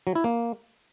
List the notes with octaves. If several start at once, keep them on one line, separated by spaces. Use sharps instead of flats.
F#3
E4
A#3